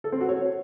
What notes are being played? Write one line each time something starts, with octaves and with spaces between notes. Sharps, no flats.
A4
C4
F#4
C#5